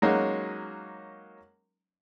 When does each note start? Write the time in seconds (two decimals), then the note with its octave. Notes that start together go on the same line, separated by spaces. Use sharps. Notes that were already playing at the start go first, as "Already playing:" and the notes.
0.02 F#3 G#3 A#3 C#4 D#4 F#4